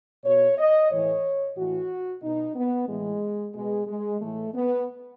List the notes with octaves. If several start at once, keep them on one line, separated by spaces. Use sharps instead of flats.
B2 C#5
D#5
A2 E3 C#5
A2 E3 F#4
B2 D#4
B3
A2 E3 G#3
B2 G#3
G#3
A2 E3 A3
B3